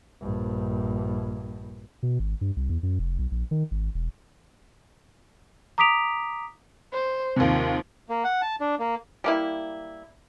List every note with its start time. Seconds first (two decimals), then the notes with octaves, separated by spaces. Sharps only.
0.22 A#1 G2
2.03 B2
2.19 G#1
2.41 G2
2.56 C2
2.69 E2
2.83 F#2
2.99 F1
3.19 B1
3.31 A#1
3.51 D#3
3.71 G#1
3.94 E1
5.78 A#5 D6 D#6 B6 D7 F7
6.93 C5
7.36 D#2 C3 F3
8.09 A#3
8.24 F#5
8.42 A5
8.61 D4
8.79 A#3
9.24 G3 A#3 E4